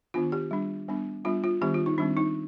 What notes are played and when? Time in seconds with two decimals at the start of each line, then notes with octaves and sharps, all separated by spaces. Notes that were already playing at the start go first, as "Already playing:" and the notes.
0.14 D#3 B3 D4 F4
0.32 G4
0.51 G3 D4
0.88 G3 B3 D4
1.25 G3 B3 D4 F4
1.44 F4
1.61 D#3 G3 B3 D4 G4
1.74 F4
1.86 D#4
1.98 D#3 G3 C4 D4
2.17 D#4